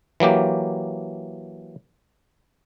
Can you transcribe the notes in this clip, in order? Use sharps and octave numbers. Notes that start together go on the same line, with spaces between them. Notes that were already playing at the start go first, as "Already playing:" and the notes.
E3 F#3 A#3 G4